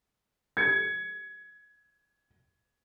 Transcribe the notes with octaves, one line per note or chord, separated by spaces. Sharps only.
G#6 C#7